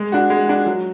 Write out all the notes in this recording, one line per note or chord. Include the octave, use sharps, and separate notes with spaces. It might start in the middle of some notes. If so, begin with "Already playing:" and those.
Already playing: G#3
D4 F#4
G#3
D4 F#4
F#3